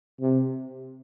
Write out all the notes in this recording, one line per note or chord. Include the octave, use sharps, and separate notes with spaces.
C3